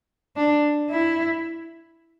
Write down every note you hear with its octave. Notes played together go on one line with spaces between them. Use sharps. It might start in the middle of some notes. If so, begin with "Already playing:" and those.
D4
E4